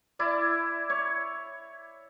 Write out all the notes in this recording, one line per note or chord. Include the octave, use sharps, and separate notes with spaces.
E4 D5
C#5